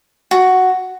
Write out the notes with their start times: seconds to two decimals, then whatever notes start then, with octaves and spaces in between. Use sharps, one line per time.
0.31 F#4